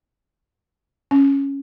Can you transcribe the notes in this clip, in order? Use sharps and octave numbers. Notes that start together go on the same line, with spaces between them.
C#4